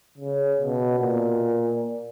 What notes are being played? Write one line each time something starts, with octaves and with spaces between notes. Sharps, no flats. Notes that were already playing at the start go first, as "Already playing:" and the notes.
C#3
B2
A#2